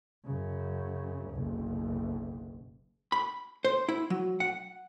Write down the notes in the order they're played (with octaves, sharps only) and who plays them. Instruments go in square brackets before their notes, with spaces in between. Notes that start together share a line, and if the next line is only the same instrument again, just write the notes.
[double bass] F#2 C#3
F#1 B1
[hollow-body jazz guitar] B5
C5
E4
F#3
F#5